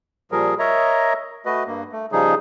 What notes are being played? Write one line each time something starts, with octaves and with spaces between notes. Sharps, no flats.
A#2 F3 G3 G#4 A#4
A#4 C#5 D#5 E5 A#5
A3 F#4 B4 D#5
G2 A#3
A3
C#3 F3 G3 D#4 G#4